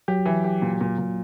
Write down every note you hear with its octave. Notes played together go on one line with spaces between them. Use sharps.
F#3 G4
E3
G4
A#2
A#2
A#2